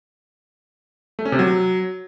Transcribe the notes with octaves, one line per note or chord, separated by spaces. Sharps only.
A3
C#4
C3
F#3